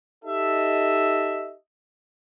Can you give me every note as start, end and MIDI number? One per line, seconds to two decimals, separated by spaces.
0.25 1.54 63
0.25 1.54 67
0.25 1.54 69
0.25 1.54 75
0.25 1.54 76